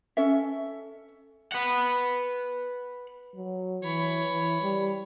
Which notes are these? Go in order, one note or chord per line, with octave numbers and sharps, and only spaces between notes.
C#4 A4 E5
B4 F#5
F#3
E3 C#5 B5
E3
G3